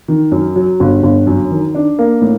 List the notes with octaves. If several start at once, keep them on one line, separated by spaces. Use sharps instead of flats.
D#3
F#2
F#3
G1
G1
F#2
D#3
D4
A#3
A2